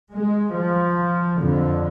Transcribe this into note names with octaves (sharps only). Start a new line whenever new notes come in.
G#3
F3
F2 D3